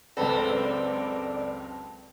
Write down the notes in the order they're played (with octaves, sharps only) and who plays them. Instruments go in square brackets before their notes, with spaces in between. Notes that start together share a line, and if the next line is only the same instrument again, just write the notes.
[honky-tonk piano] C#2 B4 [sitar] F#2 C4 [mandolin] A4 [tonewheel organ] D5